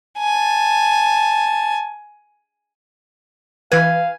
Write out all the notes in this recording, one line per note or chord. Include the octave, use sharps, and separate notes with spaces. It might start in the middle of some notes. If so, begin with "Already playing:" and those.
G#5 A5
E3 B4 F5 G#5